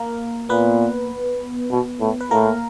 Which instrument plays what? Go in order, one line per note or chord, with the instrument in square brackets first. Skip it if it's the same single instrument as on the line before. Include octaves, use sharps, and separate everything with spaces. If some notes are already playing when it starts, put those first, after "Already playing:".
Already playing: [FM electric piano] A#3 A#4
[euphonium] A#2 [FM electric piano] B3 B4
[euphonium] B2
A2
[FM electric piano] B4
[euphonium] A2 [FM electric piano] A#3 A#4